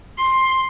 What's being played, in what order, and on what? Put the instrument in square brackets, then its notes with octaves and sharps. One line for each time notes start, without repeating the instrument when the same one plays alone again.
[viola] C6